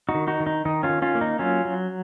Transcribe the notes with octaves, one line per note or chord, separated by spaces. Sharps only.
D#4 F#4
D#3
D#4 F#4
D#3
D#4
D#3 D#4
C#4 F4
D#3
C#4 F4
A#3
D#4
F#3 C#4 F4
F#3